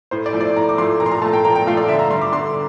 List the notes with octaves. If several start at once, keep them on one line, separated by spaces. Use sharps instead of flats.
A2 C5
D5
F3 A3
D5
A2 A#5
D6
F3 A3 C6
A#2 A#5
C6
A#5
F3 A3 A5
G5
A#2 A#5
G5
F3 A3 F5
D5
D3 E5
A#5
G3 C6
D6
D3 C6